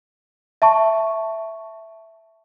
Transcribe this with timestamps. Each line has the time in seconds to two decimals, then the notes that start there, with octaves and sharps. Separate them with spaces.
0.62 E5 A5 C#6